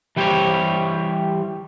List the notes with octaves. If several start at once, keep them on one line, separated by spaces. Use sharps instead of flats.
E3 G3 G4 A4 C5 C#5